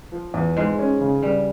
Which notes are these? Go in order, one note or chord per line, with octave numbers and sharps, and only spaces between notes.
F3
E2
F2 G#2 G#3
C#4
C#3
G2 C#3 G3